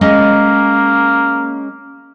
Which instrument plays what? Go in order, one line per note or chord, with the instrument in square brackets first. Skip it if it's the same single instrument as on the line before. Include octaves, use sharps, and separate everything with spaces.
[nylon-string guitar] G#3 C#4 D#5 [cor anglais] A#3